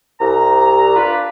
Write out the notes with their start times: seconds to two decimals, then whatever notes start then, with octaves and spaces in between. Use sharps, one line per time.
0.21 C2 A#5
0.96 D4 F4 B4